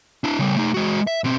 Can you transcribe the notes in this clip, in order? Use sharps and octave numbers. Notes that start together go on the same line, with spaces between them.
D4 E4
C#3 G3
A3 D#4
G#3 F#4
E5
B2 C4